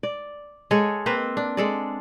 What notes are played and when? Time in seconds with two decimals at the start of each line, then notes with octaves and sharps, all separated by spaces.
0.03 D5
0.71 G#3 A4 C#5 D#5
1.06 A#3 C4 B4 C5
1.37 D4
1.57 G#3 A4 D5